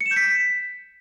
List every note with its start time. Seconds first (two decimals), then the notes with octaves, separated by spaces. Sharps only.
0.01 C#7
0.06 E7
0.11 G6
0.16 B6